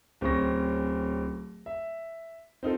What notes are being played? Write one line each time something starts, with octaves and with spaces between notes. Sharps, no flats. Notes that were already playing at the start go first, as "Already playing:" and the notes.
D1 C4 C#4 C#6 A#6
E5
C4 D#4 F4 A4